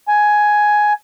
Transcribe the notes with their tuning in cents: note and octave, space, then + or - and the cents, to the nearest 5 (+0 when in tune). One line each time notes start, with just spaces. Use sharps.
G#5 +10